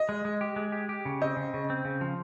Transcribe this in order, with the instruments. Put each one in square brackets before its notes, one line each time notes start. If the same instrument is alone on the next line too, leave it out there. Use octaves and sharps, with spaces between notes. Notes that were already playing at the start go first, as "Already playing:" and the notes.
Already playing: [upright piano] D#5
[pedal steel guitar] G#3
G#3
G4
G#3
G4
G4
C#3
[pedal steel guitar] C4 [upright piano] D#5
[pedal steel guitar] C#3
C#3
C4
C#3
F3